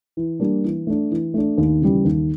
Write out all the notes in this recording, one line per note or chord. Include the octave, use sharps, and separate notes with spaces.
E3
G3 A#3 D4
E3
A3 D4
E3
A3 D4
D#2
C#3 E3 G3
D#2